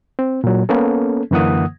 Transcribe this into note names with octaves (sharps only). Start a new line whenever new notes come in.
C4
A#2 F#3
A#3 B3 C#4 A4
F#2 D3 E3 A#3 F#5 D#6